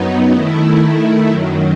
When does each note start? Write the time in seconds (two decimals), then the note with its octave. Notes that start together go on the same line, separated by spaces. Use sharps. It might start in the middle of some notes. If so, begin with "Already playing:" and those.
Already playing: F#2 F#3 B3 D#4
0.31 D#3 A3 E4
1.28 F#2 D#3 F#3